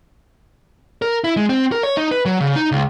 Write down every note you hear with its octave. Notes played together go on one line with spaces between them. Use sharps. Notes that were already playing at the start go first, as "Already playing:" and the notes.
A#4
E4
G#3
C4
A#4
C#5
D#4
B4
F#3
C#3
D#4
C#2